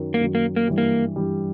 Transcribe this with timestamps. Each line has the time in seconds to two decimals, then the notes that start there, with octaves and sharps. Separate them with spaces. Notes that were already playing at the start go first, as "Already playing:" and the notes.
Already playing: F#2 D#3 F#3
0.14 A#3
0.20 F#2 D#3 F#3
0.35 A#3
0.56 A#3
0.68 G2 E3 G3
0.78 A#3
1.16 G2 E3 G3